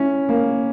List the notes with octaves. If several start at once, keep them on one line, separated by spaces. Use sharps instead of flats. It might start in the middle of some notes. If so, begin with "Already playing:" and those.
Already playing: C#4 E4
A#3